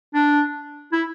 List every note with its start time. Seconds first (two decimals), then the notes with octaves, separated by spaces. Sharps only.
0.14 D4
0.92 E4